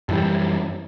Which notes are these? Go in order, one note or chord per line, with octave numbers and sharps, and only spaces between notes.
F#2 E3 G3